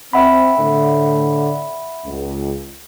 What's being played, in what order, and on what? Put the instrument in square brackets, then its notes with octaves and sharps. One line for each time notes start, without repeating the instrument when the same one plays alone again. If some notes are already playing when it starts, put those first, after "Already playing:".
[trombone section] C4 [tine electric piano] E5 F#5 B5
[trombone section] A2 D3
C#2